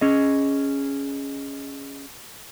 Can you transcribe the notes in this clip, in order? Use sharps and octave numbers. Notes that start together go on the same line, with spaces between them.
C#4 G#4 D#5